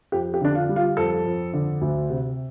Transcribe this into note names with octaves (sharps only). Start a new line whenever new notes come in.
F2 G4
G4
D3 D4
F4
G3
F4
F2 A4
F2
D3
D2
C3